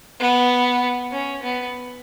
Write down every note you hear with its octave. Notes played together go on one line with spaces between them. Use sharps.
B3
C#4
B3